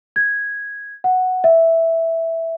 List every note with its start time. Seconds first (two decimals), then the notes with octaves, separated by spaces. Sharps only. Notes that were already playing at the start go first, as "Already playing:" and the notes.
0.16 G#6
1.04 F#5
1.44 E5